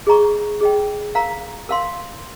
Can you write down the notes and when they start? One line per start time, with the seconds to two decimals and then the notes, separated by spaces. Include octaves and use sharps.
0.07 G#4 D#5 A#5 C#6
0.61 G#4 D#5 G5
1.15 A#4 F5 A#5
1.69 A#4 F5 C6